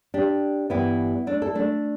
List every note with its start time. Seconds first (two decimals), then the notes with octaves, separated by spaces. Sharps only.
0.14 D4 G4
0.70 G2 E3 G3 B3 E4
1.27 A3 D4
1.42 E4 A4
1.55 A3 D4